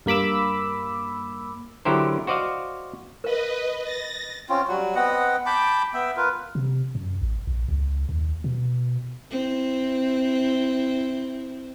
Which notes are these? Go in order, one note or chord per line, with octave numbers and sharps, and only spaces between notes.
G2 A#3 B5 D6 E6
D3 F#3 E4 G4 A#4 C5
F#4 C5 D5 D#5 F5
A#4 B4 D#5 F5
A6 A#6
C4 C#4 F4
F#3 G3 F#4
B3 C4 D#5 F#5
G5 A5 B5 D6
B3 E5 G5
F4 A#4 B4
C3
F#2
A1
A#1
C#2
D#2
B2
C4 E4